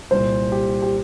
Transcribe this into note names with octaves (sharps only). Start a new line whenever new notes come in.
C2 A#2 C5
G4
G4